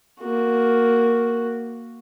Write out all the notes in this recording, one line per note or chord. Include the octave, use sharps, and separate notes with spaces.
A#3 F#4